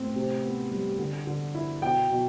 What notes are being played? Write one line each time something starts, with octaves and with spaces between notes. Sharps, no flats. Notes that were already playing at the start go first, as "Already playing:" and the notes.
Already playing: A2 C4
C3
B3
G3
D3
D3
E4
B2 G5
B2